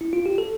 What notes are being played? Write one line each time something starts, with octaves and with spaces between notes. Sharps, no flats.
E4
F4
G4
A4